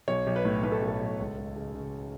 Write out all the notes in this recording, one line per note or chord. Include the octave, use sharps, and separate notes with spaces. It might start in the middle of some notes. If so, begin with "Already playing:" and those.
B1 C#5
B1
B4
A2
A2 B4
A4
B1
A4
B1
C#2
C#2
C#3
C#3